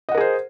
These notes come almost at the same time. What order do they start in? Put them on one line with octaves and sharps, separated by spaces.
D#5 F#5 A#4 G#4 C5